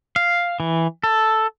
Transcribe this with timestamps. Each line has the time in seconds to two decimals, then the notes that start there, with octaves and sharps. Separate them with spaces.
0.16 F5
0.60 E3
1.03 A4